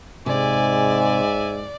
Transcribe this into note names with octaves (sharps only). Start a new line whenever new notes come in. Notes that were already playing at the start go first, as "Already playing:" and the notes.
G#2 C3 G#4 D5 E5 G#5